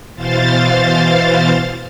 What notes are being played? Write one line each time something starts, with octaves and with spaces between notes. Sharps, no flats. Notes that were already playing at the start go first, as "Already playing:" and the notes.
B2 E3 C5 F5 A6